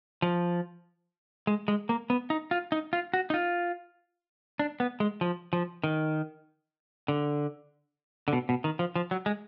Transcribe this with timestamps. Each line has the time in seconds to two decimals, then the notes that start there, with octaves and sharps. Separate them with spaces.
0.22 F3
1.47 G#3
1.68 G#3
1.89 A#3
2.10 B3
2.30 D#4
2.51 F4
2.72 D#4
2.93 F4
3.14 F#4
3.30 D#4
3.34 F4
4.59 D4
4.80 B3
5.00 G#3
5.21 F3
5.53 F3
5.84 D#3
7.08 D3
8.28 D3
8.33 B2
8.49 B2
8.64 D#3
8.79 F3
8.96 F3
9.11 F#3
9.26 G#3